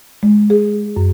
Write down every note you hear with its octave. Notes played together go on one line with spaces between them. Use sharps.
G#3
G#4
F#2